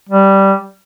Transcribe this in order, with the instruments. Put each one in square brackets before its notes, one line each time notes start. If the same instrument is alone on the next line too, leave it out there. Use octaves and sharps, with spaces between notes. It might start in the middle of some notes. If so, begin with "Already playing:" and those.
[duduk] G3